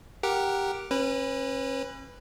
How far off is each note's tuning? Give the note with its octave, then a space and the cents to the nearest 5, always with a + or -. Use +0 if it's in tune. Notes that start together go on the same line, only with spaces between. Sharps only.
G4 +0 A#4 +0 F#5 +0
C#4 -35 B4 +0